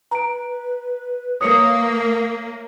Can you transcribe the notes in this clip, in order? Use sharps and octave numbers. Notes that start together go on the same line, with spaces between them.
B4 A#5 D7
A#3 C#5 E5 D#6 C#7